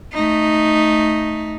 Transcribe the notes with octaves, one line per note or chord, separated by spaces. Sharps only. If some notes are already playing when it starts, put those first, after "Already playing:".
A3 D#4